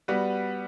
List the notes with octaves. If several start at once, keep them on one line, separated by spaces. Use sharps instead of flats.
G3 B3 F#4 B4